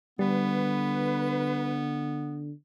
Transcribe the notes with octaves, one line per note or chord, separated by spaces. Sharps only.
D3 G3 B3 B4